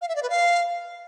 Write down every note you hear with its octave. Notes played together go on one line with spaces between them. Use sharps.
F5
E5
D5
B4
F5